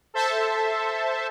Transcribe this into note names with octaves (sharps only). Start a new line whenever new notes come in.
A4 C5 E5 A5